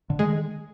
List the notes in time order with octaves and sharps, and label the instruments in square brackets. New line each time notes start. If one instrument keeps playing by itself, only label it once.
[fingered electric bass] D3
[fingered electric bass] D#3 [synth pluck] G#3